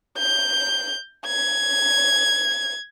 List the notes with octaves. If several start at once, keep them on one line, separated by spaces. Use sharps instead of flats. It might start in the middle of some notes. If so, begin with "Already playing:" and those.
G6
G#6